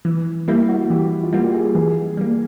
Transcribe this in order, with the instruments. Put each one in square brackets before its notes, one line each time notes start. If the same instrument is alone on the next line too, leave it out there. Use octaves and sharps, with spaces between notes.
[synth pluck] E3
[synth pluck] G3 A#3 [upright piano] E4
[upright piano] F#4
[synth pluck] E3 [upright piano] G4
[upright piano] F4
[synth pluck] G3 A#3 [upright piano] F#4
[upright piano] G4
G#4
[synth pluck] E3 [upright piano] G#4
[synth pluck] G3 A#3